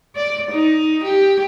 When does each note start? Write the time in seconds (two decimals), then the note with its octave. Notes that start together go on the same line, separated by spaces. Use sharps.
0.16 D5
0.51 D#4
1.04 G4